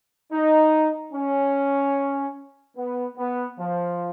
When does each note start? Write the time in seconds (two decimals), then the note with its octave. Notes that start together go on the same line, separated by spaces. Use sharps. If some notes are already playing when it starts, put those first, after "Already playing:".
0.32 D#4
1.13 C#4
2.77 B3
3.18 B3
3.59 F3